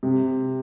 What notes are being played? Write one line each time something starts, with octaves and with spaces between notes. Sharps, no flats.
C3